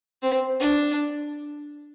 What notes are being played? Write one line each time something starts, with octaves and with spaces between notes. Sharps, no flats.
C4
D4